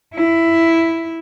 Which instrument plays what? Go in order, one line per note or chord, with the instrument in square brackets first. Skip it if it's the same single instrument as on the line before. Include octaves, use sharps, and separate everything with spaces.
[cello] E4